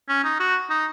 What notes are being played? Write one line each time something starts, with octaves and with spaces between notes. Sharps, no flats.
C#4
D#4
F#4
D#4